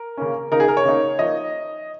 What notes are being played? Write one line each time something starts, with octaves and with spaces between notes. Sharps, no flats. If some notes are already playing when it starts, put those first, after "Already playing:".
Already playing: A#4
C#3 A#3 C#4
C#3 A#3 D#4 A#4
G#4
A#4
C#5
C#3 A#3 D#4
F3 A#3 D#4 D#5